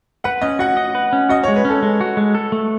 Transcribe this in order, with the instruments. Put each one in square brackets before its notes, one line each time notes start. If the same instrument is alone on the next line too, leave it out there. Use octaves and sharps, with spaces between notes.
[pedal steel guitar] B4 [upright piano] F#5
[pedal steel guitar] C#4 [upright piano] D#5
[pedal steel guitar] F#4 [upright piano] F#5
[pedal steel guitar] D#5
B4
C#4
[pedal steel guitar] F#4 [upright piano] D#5
[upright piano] C#5
[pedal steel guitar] G#3
[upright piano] B4
[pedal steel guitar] C#4 [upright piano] A4
[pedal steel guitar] G#3
F#4
G#3
A4
A3